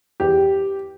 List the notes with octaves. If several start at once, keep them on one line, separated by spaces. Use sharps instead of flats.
E2 G4